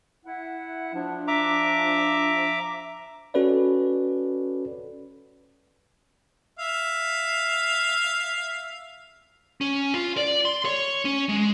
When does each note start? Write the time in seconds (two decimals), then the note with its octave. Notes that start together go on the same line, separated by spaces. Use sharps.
0.25 E4 F#5
0.94 F3 D4
1.28 E5 A#5 D6
3.34 C#4 F#4 A4 B4 C#5 D5
6.59 E5 F5
9.61 C#4
9.94 F4
10.17 D5
10.45 C6
10.65 C#5
11.05 C#4
11.29 G#3